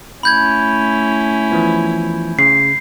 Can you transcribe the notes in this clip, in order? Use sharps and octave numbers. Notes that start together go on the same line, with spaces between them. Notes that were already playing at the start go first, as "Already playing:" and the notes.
A3 C#4 E4 B5 G6 G#6
E3 F3 B3
C#3 C7